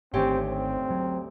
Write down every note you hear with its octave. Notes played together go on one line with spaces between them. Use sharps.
G#1 D2 D#3 C4 C#4 G4
C4
F#3